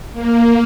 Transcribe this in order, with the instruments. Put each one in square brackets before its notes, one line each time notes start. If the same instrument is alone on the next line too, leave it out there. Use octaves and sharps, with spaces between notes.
[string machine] A#3